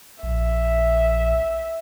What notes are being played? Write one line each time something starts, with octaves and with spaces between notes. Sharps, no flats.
A#1 E5